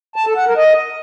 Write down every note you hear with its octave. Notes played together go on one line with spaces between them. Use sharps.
A5
A4
F#5
A#4
D#5